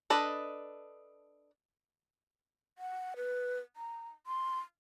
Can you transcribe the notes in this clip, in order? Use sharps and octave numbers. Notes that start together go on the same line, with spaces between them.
D4 A4 B4 D#5
F#5
B4
A#5
C6